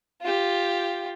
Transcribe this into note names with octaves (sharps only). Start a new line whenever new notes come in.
F4 G4